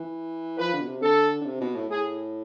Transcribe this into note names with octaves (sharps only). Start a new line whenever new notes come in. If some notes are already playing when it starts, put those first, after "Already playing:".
Already playing: E3
F3 B4
D3
B2
C3
D3 A4
D3
C3
B2
A2
A2 G#4